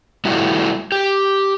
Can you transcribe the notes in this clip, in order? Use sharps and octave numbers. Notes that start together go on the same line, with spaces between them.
G3 A3 E4 F#4
G4